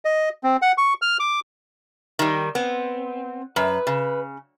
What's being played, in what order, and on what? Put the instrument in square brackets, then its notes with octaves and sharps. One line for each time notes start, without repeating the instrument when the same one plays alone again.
[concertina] D#5
C4
F#5
C#6
F6
D6
[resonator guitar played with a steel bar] D#3 G3
[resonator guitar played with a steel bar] B3 [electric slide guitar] C4
[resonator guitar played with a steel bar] F#2 [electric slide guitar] B4
[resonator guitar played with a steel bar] C#3